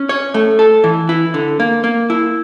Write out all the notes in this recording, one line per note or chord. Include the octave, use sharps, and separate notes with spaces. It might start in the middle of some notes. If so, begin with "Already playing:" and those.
Already playing: C#4
C#5
A3
A4
E3
E4
D3
A#3
A#3
E4